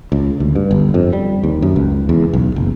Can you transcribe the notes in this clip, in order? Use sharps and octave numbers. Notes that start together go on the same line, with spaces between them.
C#2
D2
G2
G1
F2
G3
D#2
F#2
C#2
E2
B1
F#1